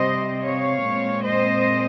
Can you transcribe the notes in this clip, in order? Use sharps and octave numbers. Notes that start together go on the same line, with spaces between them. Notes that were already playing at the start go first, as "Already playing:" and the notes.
Already playing: C3 G3 C4 C5 D#5
C#5 F5
A#2 G#3 C4
C5 D#5